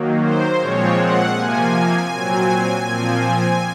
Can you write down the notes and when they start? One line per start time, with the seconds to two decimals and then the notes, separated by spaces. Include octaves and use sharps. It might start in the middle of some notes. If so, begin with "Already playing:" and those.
Already playing: D#3 F#3 A#3
0.21 C5
0.59 A#2 F3 G#3 C4 C#5
0.97 F#5
1.34 C3 F3 A#3 G#5
2.10 A#2 F#3 C4
2.85 A#2 F3 C4